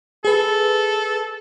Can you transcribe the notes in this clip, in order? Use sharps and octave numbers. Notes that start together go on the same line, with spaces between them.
G#4 A4 B4